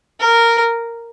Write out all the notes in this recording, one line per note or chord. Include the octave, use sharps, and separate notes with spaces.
A#4